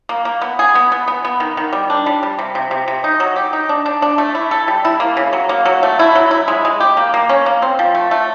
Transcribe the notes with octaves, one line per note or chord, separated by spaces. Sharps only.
A#3
A#3
B3
G#4
B3
B3
B3
B3
D#3
D#3
G3
D4
G3
G3
C3
C3
C3
C3
D#4
F#3
G4
D#4
D4
D4
D4
A3
E4
A4
G3
E4
A#3
C#3
F#3
A#3
F#3
A3
E4
F#3
E4
G#3
G#3
G4
A#3
A#3
C#4
A#3
C4
F3
A3
A3